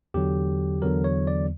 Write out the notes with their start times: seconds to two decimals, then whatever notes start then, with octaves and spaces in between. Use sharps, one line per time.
0.14 E2 D3 F#3 G4
0.82 E2 D3 F#3 A#4
1.04 C#5
1.27 D5